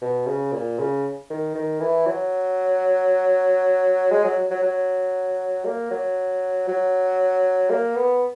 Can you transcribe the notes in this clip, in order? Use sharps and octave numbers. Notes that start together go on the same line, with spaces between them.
B2
C#3
A#2
C#3
D#3
D#3
E3
F#3
G#3
F#3
F#3
F#3
A#3
F#3
F#3
A#3
B3